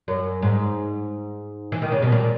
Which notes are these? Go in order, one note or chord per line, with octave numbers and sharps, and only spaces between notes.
F#2
G#2
E3
D#3
C#3
B2
A#2